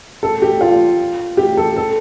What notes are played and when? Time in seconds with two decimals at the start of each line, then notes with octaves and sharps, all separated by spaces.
0.23 A4
0.42 G4
0.61 F4
1.37 G4
1.57 A4
1.76 A4